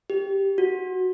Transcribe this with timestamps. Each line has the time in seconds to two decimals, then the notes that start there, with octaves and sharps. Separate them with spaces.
0.10 G4
0.58 F#4